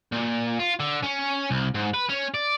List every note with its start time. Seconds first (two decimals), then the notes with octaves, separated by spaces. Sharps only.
0.12 A#2
0.59 F4
0.80 D3
1.04 C#4
1.51 C2
1.74 G#2
1.94 B4
2.09 C#4
2.34 D5